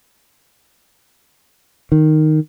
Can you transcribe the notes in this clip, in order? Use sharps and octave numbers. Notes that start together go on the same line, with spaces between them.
D#3